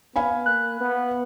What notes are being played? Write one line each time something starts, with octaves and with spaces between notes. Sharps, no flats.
B3 F5 G#5 B5
A#3 F#6
B3